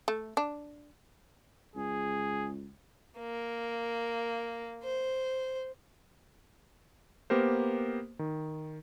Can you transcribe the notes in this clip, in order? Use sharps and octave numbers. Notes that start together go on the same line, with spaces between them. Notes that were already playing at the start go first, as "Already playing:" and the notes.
A3
D4
C#2 G#4
A#3
C5
A#3 B3 G4 A#4 C5
D#3